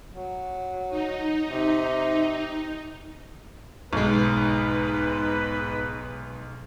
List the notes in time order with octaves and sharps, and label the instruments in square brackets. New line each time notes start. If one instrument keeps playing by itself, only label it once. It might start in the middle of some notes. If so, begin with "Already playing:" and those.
[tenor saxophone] F#3
[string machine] D#4
[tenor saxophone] C3
[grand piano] B1 G#3 [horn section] G#2 B4